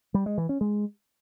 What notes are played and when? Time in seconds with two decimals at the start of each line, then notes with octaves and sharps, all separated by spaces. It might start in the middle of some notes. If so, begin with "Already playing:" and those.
0.14 G3
0.26 G#3
0.38 E3
0.49 C#4
0.61 G#3